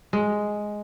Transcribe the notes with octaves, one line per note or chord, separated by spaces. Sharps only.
G#3